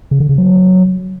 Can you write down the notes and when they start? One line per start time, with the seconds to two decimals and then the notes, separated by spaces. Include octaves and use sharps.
0.11 C#3
0.20 D3
0.29 C#3
0.38 F#3